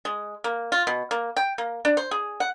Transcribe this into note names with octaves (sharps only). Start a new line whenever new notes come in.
G#3
A#3
F4
B2
A#3
G5
A#3
D4
C5
G#4
F#5